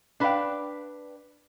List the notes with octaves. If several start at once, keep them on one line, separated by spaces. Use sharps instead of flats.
D4 B4 C5 D#5 F5 G5